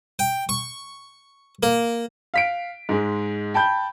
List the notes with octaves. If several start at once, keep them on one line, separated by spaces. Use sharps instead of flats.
G5
C#6
A#3
F5 B6 D7
G#2 G#3
G5 A5 B5 G6